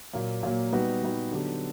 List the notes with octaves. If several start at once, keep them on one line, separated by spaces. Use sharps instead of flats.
A#2 F#3 A#3
A#2 F#3 A#3
G3 B3 D#4 F#4 B4
G3 B3 D#4 F#4 B4
D3 F#3 B3 D#4 G4